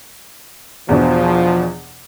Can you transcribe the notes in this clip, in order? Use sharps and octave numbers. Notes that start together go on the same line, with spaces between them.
E2 B2 F3 D4